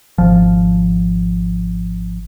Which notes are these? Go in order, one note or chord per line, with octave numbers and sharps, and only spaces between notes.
G#1 F3